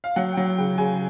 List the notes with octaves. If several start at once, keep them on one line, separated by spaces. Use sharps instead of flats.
F5
F#3 F#5
G5
F#3 F#5
C#3 G5
C#3 G#5